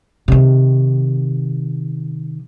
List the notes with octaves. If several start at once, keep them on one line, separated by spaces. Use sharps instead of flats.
C3 D#3